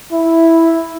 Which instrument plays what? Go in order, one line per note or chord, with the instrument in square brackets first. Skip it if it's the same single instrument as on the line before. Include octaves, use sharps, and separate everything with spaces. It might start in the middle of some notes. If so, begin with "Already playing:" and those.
[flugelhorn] E4